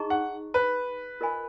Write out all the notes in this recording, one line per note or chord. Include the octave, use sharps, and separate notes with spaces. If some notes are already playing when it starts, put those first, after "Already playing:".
Already playing: D#4 G#4 D#5 A#5 C#6
F#5
B4
F4 A#4 D#5 G#5 B5